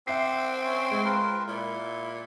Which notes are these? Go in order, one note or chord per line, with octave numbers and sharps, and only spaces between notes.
C4 E5 F#5 G5 D6 C7
C#4 C#5
G#3 C#5
F4 A#4 B4
A#2 E4